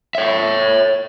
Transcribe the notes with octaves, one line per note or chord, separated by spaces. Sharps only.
C#5 E5